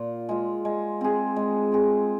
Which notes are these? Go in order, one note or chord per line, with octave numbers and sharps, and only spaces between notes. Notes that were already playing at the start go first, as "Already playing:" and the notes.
Already playing: A#2 F4
G#3 F4
G#3
C4 G#4
G#3
C4 G#4